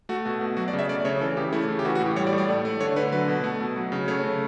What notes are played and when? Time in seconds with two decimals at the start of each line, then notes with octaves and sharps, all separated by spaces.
0.09 A3 F#4
0.25 B2 F#4
0.41 B2
0.57 F#3 F#4
0.68 D5
0.73 C#3
0.79 E5
0.89 A3 D5
1.05 C#3 C#5
1.21 E3 A4
1.37 C#3 G4
1.53 A3 E4
1.69 C#3
1.79 G4
1.85 E3 F#4
1.95 F#4
2.01 A2
2.06 G4
2.16 G3 C#5
2.27 D5
2.33 A2
2.38 D5
2.48 A3
2.65 A3
2.80 D3 C#5
2.96 D3 B4
3.12 F#3 B4
3.28 B2
3.44 A3
3.60 B2
3.76 F#3
3.92 C#3
4.08 A3 C#5
4.24 C#3